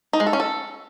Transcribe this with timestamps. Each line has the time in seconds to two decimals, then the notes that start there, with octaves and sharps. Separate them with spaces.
0.13 D#4
0.20 G#3
0.27 A4
0.33 C#4
0.40 A4